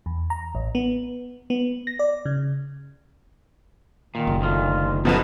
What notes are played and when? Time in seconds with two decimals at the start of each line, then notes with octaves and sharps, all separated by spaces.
0.06 E2
0.30 A#5
0.55 A1
0.75 B3
1.50 B3
1.87 A#6
1.99 D5
2.25 C#3
4.15 A#2 D#3
4.27 F#1
4.41 D2 D#3 F4
5.05 B2 F3 A3 B3 D#4 E4